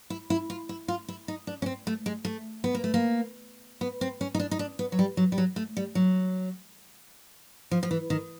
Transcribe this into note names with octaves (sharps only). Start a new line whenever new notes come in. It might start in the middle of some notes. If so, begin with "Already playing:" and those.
E4
E4
F4
E4
F4
E4
D#4
D4
C#4
C4
A3
G#3
A3
B3
A#3
A3
A#3
B3
C4
C#4
D#4
D4
D#4
D4
B3
F#3
G3
F#3
G3
F#3
A3
G3
F#3
F3
F3
E3
D#3